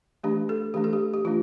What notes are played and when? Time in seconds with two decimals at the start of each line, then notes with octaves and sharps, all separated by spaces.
0.24 E3 A3 D4 G4
0.49 A4
0.74 E3 A3 D4 G4
0.84 A4
0.93 G4
1.14 G4
1.25 E3 A3 D4 F4